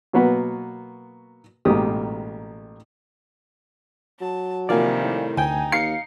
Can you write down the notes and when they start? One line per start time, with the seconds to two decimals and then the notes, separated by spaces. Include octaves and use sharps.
0.13 B2 F#3 A#3 B3 F#4 B4
1.65 A1 G#2 B2 A#3 G4 D#6
4.21 F#3 A5
4.69 C3 D#3 F3 G3 A#3 D5 F5 G#5
5.03 A2
5.37 D2 D#4 G5 G#5
5.72 D#2 F5 C7 C#7